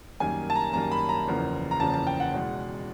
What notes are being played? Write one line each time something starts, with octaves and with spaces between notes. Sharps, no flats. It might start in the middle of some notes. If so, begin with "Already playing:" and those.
F#2 D#3 G3 A#3 G#5
A5
A#5
F#2 D#3 G3 A#3 A#5
B5
A#5
F#1 E2 C#3 F3 A#3
A#5
F#1 E2 C#3 F3 A#3 A5
A5
G5
F#5
E2 B2 G#3